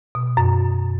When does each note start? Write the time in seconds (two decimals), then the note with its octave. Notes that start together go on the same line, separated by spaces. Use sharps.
0.15 B2
0.37 F#2